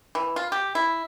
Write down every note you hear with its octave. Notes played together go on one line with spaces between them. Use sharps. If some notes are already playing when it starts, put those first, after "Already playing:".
E3
F4
G4
E4